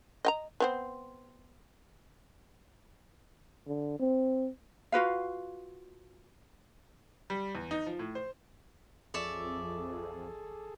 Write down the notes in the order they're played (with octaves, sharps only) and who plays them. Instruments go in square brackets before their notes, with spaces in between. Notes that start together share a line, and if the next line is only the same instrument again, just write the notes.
[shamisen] D#5 G5 A#5
B3 C4 C5
[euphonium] D3
C4
[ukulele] F4 F#4 B4 F5
[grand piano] G3
E2
D#4
F3
A2
C5
[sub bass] A1 [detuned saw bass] F2 [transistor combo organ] G#4 A4 [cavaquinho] C#5 D5 E5